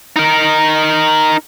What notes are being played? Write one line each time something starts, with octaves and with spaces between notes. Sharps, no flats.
D#4 A#4